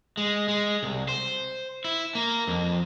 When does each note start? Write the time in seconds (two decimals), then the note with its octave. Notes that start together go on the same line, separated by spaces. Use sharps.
0.17 G#3
0.48 G#3
0.83 C2
1.09 C5
1.84 E4
2.15 A#3
2.47 F2